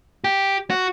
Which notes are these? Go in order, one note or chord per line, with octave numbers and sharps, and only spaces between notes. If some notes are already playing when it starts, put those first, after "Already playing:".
G4
F#4